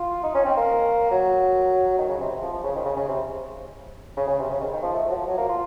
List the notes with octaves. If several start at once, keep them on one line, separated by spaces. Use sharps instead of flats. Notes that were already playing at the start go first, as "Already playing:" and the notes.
Already playing: F4
D#4
C#4
C4
A#3
F#3
D#3
C#3
C3
C3
F3
F3
C#3
D#3
C#3
C#3
C3
C#3
C#3
C3
C#3
D#3
D#3
F3
A3
F#3
F3
F#3
A#3
F4